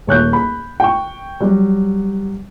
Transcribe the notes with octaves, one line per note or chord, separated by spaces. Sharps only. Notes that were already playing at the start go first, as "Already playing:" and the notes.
D#1 C#5 F#6 G6
B5
G5 C#6
F#3 G3